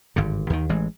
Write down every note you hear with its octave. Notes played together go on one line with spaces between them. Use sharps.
G#1 G2 D3
D#2 D#3
A1 E3 G#3